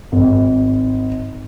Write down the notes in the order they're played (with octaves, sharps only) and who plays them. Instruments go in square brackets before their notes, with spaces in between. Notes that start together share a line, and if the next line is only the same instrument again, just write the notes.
[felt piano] G#1